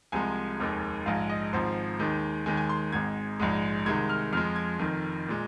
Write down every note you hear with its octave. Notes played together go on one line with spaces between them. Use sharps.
C2 C3 F3 G#3 G#5
F1 D#2 D#3 G#3
A#1 G#2 G#3 F5
D#5
G#1 G#2 F3 C5
D#2 D#3 G#3
D#2 D#3 G#3 G#5
G#5
C6
G#1 G#2 G#3 G#6
A#1 G#2 G#3
C2 C3 D#3 G#3 G#6
F6
F2 F3 G#3 F6
G#6
F1 F2 D#3
A#2 G#3